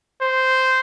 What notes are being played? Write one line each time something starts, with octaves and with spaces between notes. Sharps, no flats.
C5